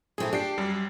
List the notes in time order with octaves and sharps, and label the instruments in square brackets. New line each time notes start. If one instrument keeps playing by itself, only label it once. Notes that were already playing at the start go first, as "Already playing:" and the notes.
[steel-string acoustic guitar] A#2 C4 E4 [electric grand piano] A3 G#4
[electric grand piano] D4 G5 C7 [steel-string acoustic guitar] G4
[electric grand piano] F#2 G3